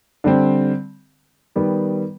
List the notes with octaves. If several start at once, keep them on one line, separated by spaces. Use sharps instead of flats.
D3 G3 C4
D#3 G3 B3